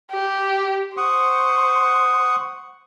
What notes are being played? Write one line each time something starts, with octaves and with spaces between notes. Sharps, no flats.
G4
C5 F#5 C#6 D#6